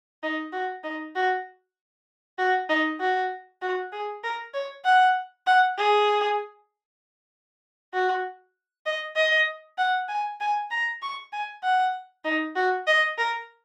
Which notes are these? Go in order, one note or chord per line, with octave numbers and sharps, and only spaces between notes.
D#4
F#4
D#4
F#4
F#4
D#4
F#4
F#4
G#4
A#4
C#5
F#5
F#5
G#4
F#4
D#5
D#5
F#5
G#5
G#5
A#5
C#6
G#5
F#5
D#4
F#4
D#5
A#4